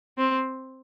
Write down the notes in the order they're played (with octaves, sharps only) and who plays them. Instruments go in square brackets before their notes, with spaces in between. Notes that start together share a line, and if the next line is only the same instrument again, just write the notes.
[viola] C4